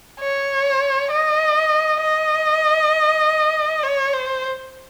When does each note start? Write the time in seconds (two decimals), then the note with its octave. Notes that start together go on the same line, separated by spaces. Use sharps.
0.20 C#5
1.11 D#5
2.01 D#5
3.83 C#5
4.13 C5